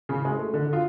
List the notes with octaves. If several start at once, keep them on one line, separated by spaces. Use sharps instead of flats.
C#3
G#3
A3
D3
F4